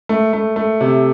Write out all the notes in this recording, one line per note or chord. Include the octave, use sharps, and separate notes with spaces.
A3
A3
A3
C3